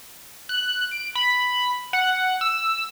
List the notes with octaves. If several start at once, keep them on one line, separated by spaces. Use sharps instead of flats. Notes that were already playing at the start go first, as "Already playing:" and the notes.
F#6
D7
B5
F#5
E6